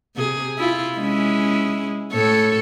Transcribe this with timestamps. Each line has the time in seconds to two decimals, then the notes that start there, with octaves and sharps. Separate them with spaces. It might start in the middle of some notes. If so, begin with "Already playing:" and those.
0.16 C3 G#4
0.58 E4 F4
0.97 G#3 C#4 E4
2.13 A2 A4 C#5